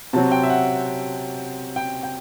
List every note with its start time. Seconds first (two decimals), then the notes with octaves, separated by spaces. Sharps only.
0.13 C3 F#3 C4 A5
0.32 G5
0.43 E5
0.50 F#5
1.76 G5
2.03 G5